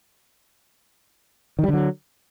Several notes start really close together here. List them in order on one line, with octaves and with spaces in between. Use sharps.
D#3 G3 D3 F#3